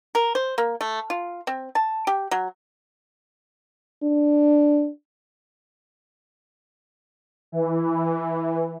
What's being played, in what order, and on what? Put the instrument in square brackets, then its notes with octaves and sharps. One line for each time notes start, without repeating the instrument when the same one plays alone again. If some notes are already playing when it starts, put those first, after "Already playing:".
[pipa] A#4
C5
A#3
A3
F4
C4
A5
G4
F#3
[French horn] D4
[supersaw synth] E3